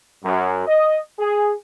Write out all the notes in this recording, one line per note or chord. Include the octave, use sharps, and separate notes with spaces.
F#2
D#5
G#4